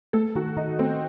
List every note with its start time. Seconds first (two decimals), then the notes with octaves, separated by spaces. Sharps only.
0.13 A3 A4
0.36 D#3 F#4
0.57 D#3 D#4
0.79 A3 C4